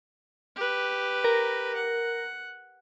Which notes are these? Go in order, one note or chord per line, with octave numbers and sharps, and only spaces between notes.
G4 B4
A#4
F#5